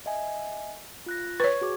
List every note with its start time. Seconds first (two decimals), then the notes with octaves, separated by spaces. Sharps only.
0.06 D#5 E5 G#5
1.06 F4 F#6 A#6
1.40 B4 C#5 C#6 G#6
1.61 F#4 G#4 D6